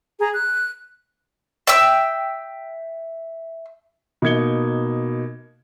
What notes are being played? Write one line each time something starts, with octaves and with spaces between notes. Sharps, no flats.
G#4 A#5
F#6
E5 G5 E6
B2 A#3 D#4 G#6 C#7 G7